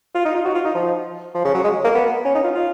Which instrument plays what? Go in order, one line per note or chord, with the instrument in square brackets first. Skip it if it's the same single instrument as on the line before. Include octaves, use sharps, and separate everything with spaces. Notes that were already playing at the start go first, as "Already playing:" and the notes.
[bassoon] F4
D#4
F4
F#4
F4
D#4
F3
F3
C#3
F#3
G#3
A#3
B3
C#4
D#4
F4
F4